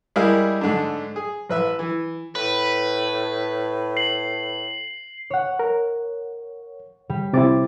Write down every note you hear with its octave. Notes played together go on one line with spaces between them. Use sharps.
G3 G#3 E4 G#4 A#4 F5
G#2 D3 A3 D4
G#4
A1 B4 E5
E3
A2 B4
C7 F#7
C#5 F#5
A#4
G3
C3 C4 E4 D6 A6